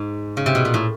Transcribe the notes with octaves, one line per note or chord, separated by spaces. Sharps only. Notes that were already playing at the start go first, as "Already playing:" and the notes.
Already playing: G#2
C#3
C3
B2
A#2
A2